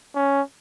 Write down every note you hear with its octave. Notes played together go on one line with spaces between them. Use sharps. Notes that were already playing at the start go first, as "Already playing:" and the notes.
C#4